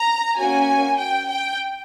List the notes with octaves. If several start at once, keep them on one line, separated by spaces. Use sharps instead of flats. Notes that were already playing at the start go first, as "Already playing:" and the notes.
Already playing: A#5
A#3 C#4 F#4 G#5
G5
G5